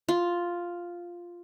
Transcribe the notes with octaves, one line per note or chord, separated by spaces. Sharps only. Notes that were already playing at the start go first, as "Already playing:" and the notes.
F4